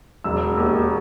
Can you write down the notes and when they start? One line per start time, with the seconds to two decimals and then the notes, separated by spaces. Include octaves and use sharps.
0.24 E1 E6
0.57 D#2